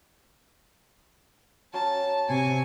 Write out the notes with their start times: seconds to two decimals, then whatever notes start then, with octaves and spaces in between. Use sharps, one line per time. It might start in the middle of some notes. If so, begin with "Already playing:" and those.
1.73 F#3 C#4 A5 C6
2.29 C3 G#5 C#6